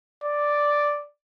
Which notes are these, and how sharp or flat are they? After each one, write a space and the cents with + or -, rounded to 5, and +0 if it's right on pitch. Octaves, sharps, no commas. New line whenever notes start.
D5 +0